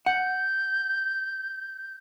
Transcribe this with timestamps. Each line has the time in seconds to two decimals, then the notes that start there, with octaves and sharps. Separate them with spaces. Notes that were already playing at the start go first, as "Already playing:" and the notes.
0.06 F#5 G6